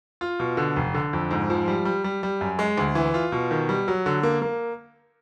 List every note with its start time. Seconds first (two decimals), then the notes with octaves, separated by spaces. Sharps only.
0.21 F4
0.40 B2
0.57 D3
0.76 F1
0.94 D3
1.13 F2
1.31 G#2
1.50 F3
1.68 G3
1.85 G3
2.04 G3
2.23 G3
2.41 F#2
2.59 G#3
2.78 D2
2.95 E3
3.14 F4
3.32 B2
3.51 D#3
3.69 G3
3.88 F#3
4.06 D3
4.23 A#3
4.42 A#3